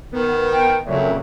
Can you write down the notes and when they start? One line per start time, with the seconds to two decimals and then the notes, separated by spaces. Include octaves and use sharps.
0.12 D#3 B3
0.52 G5
0.85 F2 A#2 C#3 F#3 E5